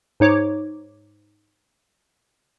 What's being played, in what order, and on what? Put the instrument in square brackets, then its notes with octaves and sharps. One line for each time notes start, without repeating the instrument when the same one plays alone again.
[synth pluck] G#2 D#4 C#5 D6